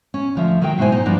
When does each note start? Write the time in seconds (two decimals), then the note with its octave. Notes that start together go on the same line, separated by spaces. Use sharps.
0.14 C#4
0.35 D2 F3 E5
0.61 D#3 F#3 A#3 E5 G5
0.78 G#2 B2 F#3 E4 C5 G#5
0.92 D#4
1.06 G2 F3 A#3 B3 D4